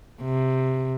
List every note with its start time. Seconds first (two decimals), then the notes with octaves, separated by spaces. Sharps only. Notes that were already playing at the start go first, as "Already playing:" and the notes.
0.23 C3